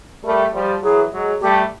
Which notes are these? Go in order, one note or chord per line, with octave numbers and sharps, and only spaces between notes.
G3 A3 A#4
F3 G3
E3 F#3 G#4
F#3 G#3
G3 A3 G4